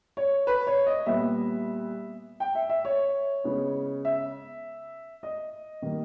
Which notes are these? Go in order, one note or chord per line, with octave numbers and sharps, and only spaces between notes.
C#5
B4
C#5
D#5
A#2 G3 B3 E5
G5
E5
E5
C#5
C#3 G#3 B3
E5
D#5
D#3 G3 A#3